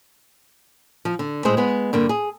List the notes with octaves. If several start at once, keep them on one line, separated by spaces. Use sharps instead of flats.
F3
D3
A2 G#3 C4 G#4 C5
G#3 B3
G2 D3 A#3
G#4